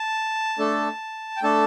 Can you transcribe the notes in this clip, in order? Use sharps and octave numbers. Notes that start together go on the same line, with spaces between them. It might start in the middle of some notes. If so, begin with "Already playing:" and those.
Already playing: A5
A3 D4 A4
G5
A3 D4 A4 A5